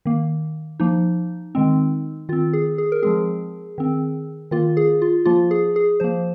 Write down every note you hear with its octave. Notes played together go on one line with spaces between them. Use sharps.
D#3 A#3
F3 A#3 D#4
D#3 G#3 C4
D#3 C4 F4
G#4
G#4
A#4
F3 G#3 C4 G#4
D#3 C4
D#3 A#3 F4
G#4
F4
F3 A#3 F4
G#4
G#4
F3 A#3 C5